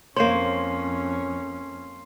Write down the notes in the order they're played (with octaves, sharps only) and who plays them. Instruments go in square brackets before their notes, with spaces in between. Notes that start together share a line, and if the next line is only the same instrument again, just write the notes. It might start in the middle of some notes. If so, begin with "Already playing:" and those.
[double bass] F2 C#4 [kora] A#3 C5 C#5 [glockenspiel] C6 C7